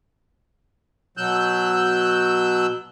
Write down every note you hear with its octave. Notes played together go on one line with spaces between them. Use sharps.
B2 F#3 E6 F#6 G6